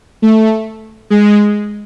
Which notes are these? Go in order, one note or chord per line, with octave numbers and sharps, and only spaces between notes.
A3
G#3